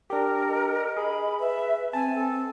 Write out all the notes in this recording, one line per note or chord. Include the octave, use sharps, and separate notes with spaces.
D4 G4 A#4
D#5
G#4 B5
B4 E5
C4 G#5 A5
A4